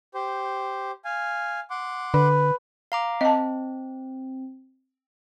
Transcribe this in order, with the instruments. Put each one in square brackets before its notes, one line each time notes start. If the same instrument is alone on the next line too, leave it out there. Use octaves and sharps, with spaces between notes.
[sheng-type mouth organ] G4 C5
F5 G#5
F#5 C6 D6
[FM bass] D3 [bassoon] B4
[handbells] F5 A#5 D6
[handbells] C4 [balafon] D#5 A5